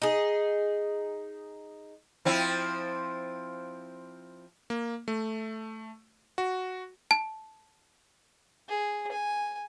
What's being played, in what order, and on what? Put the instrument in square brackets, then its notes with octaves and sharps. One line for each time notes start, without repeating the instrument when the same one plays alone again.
[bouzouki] D#4 G#4
[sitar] F3 C4 E4
[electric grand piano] A#3
A3
F#4
[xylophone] A5
[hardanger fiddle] G#4
G#5